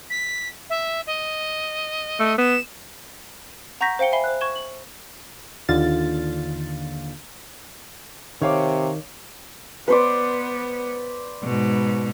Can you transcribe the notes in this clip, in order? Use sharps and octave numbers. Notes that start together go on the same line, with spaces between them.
B6
E5
D#5
A3
B3 E7
F#5 A#5 C#6 G6 A#6 B6
C5 F5 G5 C#7 G7
E5 G#5 B5 C7 G7
C5 F#6
C#6 G#6 E7 G7
F#7
D#2 D3 F4 F5 A6
C3 D#3 C#5 F5 D6
B3 B4 C5 D5
G#2 B2